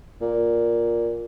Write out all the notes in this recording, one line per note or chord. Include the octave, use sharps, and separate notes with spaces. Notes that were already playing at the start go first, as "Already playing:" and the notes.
A#2